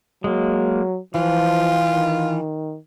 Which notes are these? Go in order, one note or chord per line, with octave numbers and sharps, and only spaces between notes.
F#3 G#3 A#3
E3 F3 F4
D#3